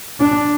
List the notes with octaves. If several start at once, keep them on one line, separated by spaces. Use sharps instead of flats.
D4